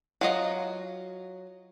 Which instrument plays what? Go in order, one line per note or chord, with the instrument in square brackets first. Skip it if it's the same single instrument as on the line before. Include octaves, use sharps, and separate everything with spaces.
[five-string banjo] F#3 F4 D#5